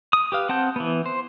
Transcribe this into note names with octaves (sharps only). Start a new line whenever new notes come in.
D#6
G4 B4 F5
C4 F#5 A5 G6
E3 B3
C5